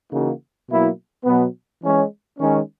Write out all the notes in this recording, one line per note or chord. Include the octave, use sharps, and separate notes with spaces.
C#3 E3 A#3 D#4 F#4
B2 F#3 A#3 E4
B2 F#3 B3
E3 G#3 C#4
D#3 G#3 C#4